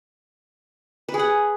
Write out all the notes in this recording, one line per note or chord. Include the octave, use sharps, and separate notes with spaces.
B4
G#4
F#5